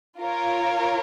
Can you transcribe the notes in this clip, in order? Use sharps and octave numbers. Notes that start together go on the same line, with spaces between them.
F4 A#4 C#5